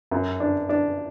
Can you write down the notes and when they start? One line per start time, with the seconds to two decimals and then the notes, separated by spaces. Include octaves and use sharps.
0.11 F#2
0.40 D4
0.69 D4